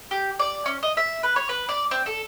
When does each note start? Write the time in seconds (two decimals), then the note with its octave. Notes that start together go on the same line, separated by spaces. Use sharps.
0.11 G4
0.39 D5
0.66 C#4
0.83 D#5
0.97 E5
1.23 B4
1.36 C#5
1.49 B4
1.69 D5
1.91 C4
2.06 A4